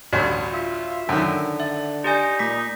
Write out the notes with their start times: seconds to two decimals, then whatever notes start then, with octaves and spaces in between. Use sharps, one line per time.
0.13 A1 D2 G2 F#4
0.53 F4 E5
1.09 F#2 D3 D#3
1.60 E5
2.04 D#4 G4 D5 G#5
2.39 A#2 A3 D#6 B6